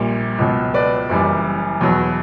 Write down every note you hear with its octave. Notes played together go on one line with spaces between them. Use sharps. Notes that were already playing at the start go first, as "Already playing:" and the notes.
Already playing: A#1 A#2 G3
C#2 B2 F#3
B4 D5
F#1 F#2 E3 G3
E2 B2 F#3